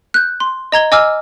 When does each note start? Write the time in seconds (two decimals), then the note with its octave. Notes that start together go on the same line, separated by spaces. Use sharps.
0.14 F#6 G6
0.40 C6
0.72 D#5 A#5 G#6 G7
0.92 D#5 G#5 D6 E6 F6